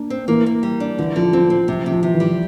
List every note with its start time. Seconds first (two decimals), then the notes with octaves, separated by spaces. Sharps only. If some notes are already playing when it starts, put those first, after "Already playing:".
Already playing: A#3 D4
0.10 C4
0.28 E3 A#3
0.46 A#3
0.63 G3
0.80 D4
0.98 D3 E3
1.16 D3 F3
1.33 F3 C4
1.50 C4
1.68 C3 F3
1.79 F3
1.86 C3
1.91 F3
2.03 C3 E3
2.14 E3
2.20 G3
2.26 E3